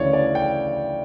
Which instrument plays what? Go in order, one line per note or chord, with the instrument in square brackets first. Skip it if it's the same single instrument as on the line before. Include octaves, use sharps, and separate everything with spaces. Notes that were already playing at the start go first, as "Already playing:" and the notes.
Already playing: [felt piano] D2 C#3 E3 [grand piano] C#5 D5
[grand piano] D5
G5